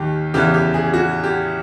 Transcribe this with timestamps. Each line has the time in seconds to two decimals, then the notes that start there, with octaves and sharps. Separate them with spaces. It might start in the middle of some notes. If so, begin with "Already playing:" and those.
Already playing: D#2 D#3 G4
0.34 E2 C#3 E3 G4
0.54 G4
0.74 G#4
0.94 F#4
1.24 G4